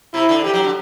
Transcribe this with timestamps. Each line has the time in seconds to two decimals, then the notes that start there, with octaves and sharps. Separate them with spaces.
0.14 C3 E4
0.29 D3
0.44 E3 G4
0.54 F#3
0.64 D3